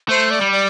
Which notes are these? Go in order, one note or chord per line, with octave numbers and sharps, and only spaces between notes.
A3 C5
D5
G3
D5